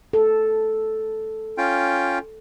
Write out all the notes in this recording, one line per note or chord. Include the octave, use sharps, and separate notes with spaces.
A4
C#4 F4 G5